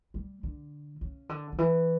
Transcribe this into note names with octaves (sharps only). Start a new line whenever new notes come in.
G3
D3
C#3
D3
D3
E3